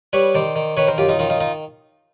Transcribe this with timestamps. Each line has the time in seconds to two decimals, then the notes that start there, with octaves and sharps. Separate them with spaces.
0.13 G3 B4 C#5
0.35 D#3 C5 D5
0.56 D#3
0.77 D#3 B4 C#5
0.88 A#4 C5
0.98 F#2 F4 G4
1.09 D#4 F4
1.19 D#3 D#4 F4
1.30 D#4 F4
1.40 D#4 F4